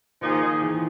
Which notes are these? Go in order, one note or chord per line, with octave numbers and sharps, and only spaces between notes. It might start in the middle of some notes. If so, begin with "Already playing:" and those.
D#3 F3 A#3 D#4 G#4
E3